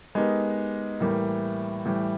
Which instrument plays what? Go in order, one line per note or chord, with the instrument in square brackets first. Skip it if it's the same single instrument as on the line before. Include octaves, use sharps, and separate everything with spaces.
[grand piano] G#3 B3 D#4 G4 A#4
A2 E3 G3 A#3
A2 E3 G3